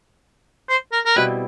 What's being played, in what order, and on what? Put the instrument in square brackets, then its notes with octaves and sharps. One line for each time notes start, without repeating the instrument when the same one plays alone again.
[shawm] C5
A#4
A#4
[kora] B2 G3 C4 E4 [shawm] B4